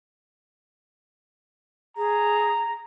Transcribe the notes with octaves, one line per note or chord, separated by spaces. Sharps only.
G#4 A#5